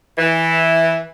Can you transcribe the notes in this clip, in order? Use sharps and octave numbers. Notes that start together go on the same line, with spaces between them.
E3